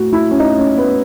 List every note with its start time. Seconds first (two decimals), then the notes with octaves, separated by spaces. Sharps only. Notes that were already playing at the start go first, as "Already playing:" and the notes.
Already playing: A2 F#4
0.13 E4
0.31 C#4
0.40 D#4
0.59 C#4
0.77 B3